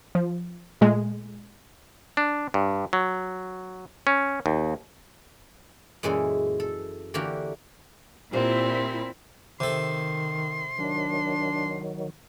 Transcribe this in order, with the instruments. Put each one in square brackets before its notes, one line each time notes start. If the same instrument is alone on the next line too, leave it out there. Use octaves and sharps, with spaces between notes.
[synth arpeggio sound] F3
A#2 G#3 A3
[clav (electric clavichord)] D4
G2
F#3
C#4
D#2
[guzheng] F#2 A#2 E3 G#3 G#4 A4
A4
D3 E3 A#3 F#4 G4 A#4
[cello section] A#2 E4 [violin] C4 [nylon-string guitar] F4 G4 C5
[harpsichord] C3 A4 [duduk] D#3 [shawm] C6
[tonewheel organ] D#3 F#3 [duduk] D4